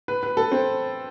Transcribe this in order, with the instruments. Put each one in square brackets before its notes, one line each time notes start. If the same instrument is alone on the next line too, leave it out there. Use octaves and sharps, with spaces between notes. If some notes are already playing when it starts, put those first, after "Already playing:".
[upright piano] B4
B4
A4
C4